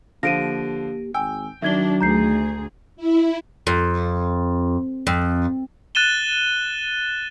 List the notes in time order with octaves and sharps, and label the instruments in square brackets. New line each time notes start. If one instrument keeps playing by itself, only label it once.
[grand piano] D3 F3 F5 [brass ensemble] A#3 G4 [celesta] A#6 D7 D#7
[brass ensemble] G#1 [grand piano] G5 [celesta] G#5 E6
[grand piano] D#3 [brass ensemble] F#3 [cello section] D4 [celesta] E5 G#6 G7
[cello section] D2 G#4 [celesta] A#5 G6 C7
[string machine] E4
[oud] F2
F2
[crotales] F#6 A6 D#7 E7 G7